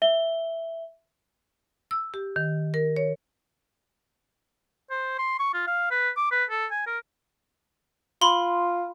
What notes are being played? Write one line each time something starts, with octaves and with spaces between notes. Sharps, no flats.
E5 G7
E6
G4
D#3
A#4
C#5
C5
C6
C#6
F4
F5
B4
D6
B4
A4
G#5
A#4
F4 B5 C6